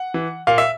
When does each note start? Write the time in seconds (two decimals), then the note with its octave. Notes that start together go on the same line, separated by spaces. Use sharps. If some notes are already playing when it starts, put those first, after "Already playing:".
Already playing: F#5
0.14 E3
0.47 A#2 F5
0.58 E5